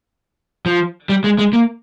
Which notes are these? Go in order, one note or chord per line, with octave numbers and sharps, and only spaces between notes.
F3
G3
G#3
G#3
A#3